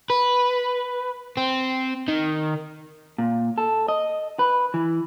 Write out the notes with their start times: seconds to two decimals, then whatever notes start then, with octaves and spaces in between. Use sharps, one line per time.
0.10 B4
1.37 C4
2.08 D#3
3.18 A#2
3.58 A4
3.88 D#5
4.39 B4
4.74 E3